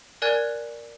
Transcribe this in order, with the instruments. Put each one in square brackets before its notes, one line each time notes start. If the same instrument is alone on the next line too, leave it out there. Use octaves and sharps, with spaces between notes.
[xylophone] A#4 D5 G#5 F#6 G#6